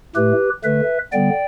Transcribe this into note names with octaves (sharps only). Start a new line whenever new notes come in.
A2 A3 G4 B4
D3 A3 B4 E5
D3 G3 B3 D5 G5